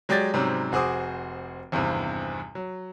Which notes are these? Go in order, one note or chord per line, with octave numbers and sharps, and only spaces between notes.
F#3 G#3 G4 D5 G#6 A6
G#2 C3 F#3 G3 C4 C#4
F1 F#4 G#4 C5 D6 D#6
G#1 E2 G2 C3
F#3